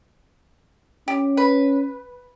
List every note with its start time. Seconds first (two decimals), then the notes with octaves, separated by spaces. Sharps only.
1.08 C#4 G4
1.37 B4